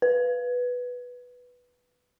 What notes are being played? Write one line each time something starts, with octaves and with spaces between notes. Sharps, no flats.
B4